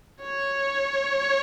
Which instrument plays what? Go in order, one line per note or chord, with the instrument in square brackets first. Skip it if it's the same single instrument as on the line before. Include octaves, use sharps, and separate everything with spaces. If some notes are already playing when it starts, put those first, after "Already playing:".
[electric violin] C#5